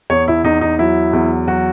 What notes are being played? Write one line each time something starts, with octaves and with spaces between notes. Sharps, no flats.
E2 C#5
E4
E2 D#4
D#4
F#3 E4
E2
F#3 F#4